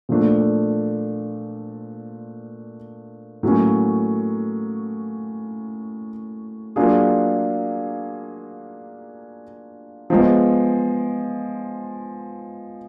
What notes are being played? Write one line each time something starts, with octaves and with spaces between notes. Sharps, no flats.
A#2 F3 A3 D4
A2 F#3 A#3 C#4
F#3 A#3 D4 F4 G#4
F3 G#3 B3